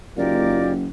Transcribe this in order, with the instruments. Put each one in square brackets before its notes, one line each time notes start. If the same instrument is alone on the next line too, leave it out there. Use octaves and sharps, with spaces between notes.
[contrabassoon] F#1 [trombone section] A#3 D#4 F4 [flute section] G4 A#4 D5